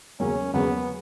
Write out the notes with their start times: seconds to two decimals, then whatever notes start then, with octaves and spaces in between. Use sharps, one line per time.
0.19 E2 C#3 F#3 A#3 C#4
0.54 E2 C#3 F#3 A#3 B3